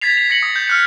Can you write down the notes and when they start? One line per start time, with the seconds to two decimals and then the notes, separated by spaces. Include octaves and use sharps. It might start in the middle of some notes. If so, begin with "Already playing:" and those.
0.01 G#6 A6 B6 C7 F7
0.17 F7
0.30 A#6 C#7 F#7
0.43 D#6
0.56 G6
0.68 F6 F#6 C#7